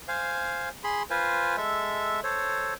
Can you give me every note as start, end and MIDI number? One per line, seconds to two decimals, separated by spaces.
0.08 0.69 72
0.08 0.69 77
0.08 0.69 80
0.84 1.03 68
0.84 1.03 83
0.84 1.03 84
1.10 1.56 65
1.10 1.56 71
1.10 1.56 72
1.10 1.56 80
1.57 2.20 56
1.57 2.20 69
1.57 2.20 76
2.24 2.74 69
2.24 2.74 72
2.24 2.74 73